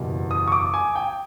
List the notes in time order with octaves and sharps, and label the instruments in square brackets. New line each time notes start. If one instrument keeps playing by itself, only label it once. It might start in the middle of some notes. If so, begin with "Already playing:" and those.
Already playing: [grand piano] F#1 E2 B2 G3
D#6
C#6
D6
G#5
G5